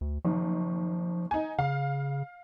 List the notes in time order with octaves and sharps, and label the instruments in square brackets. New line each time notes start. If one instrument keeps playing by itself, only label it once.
[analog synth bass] D2
[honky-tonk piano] F#1 D#3 [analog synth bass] F3
[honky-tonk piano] D#4 G#5
[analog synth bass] C#3 [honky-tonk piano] F5